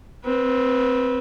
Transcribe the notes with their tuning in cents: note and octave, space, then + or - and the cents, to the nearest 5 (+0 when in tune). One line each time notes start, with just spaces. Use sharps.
C4 +0 B4 -20